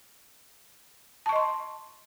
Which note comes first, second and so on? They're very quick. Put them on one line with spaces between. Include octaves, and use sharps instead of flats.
A5 C#6 D#5 C6